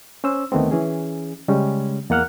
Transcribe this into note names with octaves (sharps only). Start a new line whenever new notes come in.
C#4 C5 E6
D2 D#3 A3 B3 C4
E3 C#4 G#4
C#3 G3 G#3 C#4
E2 A#3 F#5 F6 F#6